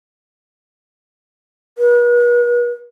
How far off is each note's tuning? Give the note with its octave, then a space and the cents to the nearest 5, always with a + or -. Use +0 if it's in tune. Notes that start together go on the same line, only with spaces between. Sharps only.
B4 -45